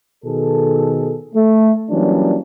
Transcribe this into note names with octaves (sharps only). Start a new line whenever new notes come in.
B2 D#3 G#4 A4
A3
E3 F#3 G3 A#3 C#4 D4